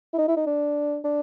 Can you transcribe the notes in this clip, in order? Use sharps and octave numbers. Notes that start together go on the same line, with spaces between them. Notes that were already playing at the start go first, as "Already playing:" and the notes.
E4
D#4
E4
D#4
D4
D4